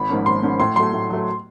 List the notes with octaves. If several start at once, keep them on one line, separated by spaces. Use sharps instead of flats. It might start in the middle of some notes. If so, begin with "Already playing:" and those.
Already playing: G#1 B5
G#2 F3 A#3 C#4
G#1 C6
G#2 F3 A#3 C#4
A2 C6
F#3 A3 C6
A2
F#3 A3